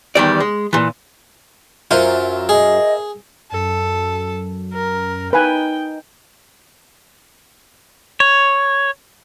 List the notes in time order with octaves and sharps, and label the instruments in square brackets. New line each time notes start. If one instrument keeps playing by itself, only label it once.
[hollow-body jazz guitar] E2 D#3 G3 D5
G#3
A#2 E3
[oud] F#2 [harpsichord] F4 [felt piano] A#4 C5 E5
[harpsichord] G#4 [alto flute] D#5
[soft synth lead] F#2 [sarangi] A4
[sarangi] A#4
[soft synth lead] D#4 [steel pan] B4 G#5 [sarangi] G5
[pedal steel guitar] C#5